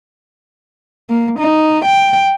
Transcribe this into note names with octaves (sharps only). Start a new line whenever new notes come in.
A#3
D#4
G5